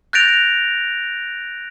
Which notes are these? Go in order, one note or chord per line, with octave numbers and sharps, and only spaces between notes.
F#6 G6 A6 A#6 D7 F7